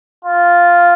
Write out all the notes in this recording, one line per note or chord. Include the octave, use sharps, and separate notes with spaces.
F4